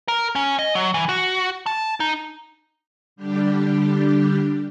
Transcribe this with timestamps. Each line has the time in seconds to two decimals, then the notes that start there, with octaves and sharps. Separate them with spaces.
0.08 A#4
0.35 C#4
0.59 D#5
0.75 F#3
0.94 E3
1.09 F#4
1.66 A5
2.00 D#4
3.16 D3 G3 D4 G4